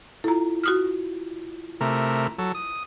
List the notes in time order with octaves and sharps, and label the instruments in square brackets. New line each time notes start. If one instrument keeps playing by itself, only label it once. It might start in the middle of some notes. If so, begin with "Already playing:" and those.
[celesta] E4 F4 [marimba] A4 A#5
[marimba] F#4 D#6 F6
[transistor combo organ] C3 A3 A#4
F#3 A4
D#6